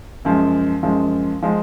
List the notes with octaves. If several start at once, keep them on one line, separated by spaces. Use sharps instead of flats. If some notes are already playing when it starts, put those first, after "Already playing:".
F#2 F3 G#3
F#2 F3 G#3
F3 G#3